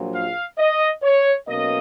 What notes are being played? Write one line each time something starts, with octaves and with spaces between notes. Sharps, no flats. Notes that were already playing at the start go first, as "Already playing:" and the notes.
Already playing: A#1 A#2 F#3
F5
D#5
C#5
B1 B2 A#3 C#4 D#5